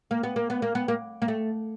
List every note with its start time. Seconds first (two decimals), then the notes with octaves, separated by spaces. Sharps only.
0.11 A#3
0.23 B3
0.36 A#3
0.50 B3
0.62 A#3
0.75 B3
0.88 A#3
1.22 A#3
1.28 A3